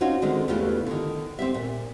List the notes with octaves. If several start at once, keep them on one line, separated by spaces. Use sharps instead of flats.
C4 C#4 D#4 F4 F#4
D3 D#3 G#3 C4 D4
E2 C#3 E3 A3 F4 G4
D3 D#3
C4 G4 E5
A#2